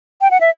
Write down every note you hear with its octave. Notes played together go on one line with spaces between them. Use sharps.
G5
F#5
E5